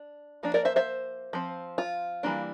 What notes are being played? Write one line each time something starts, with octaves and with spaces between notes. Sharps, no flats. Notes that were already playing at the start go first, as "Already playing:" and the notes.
Already playing: D4
F3 A#3 D4
A#4 D5
C5 E5
C5 E5
F3 C4
F4
E3 G3 A#3 D4